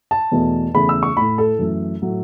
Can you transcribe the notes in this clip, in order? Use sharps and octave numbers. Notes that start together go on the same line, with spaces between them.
A5
E2 B2 A3
E2 C#3 A3 B5
E6
C#6
A2 A3 B5
A4
F#2 E3 A3
A2 F#3 A3